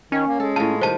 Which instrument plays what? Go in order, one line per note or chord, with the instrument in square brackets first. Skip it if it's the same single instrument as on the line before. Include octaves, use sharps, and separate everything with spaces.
[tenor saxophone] D#3 [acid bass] C#4
[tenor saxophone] A#3
[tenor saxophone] G#3 [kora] A4
[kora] A2 F4 [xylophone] A5
[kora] D#3 G3 [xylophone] C5 A5